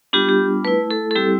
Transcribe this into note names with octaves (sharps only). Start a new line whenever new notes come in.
G3 B3 D4 F4 G4
G4
A3 E4 B4
A4
A4
G3 C4 E4 G4